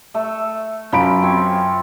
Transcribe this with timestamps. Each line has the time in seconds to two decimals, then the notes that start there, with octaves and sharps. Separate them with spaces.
0.14 A3 E5
0.92 F#2 F3 B5 D7
1.23 C4 C#5